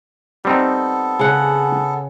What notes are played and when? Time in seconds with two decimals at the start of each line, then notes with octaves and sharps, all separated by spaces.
0.45 G3 B3 C4 D#4 A4
1.19 C#3 F#5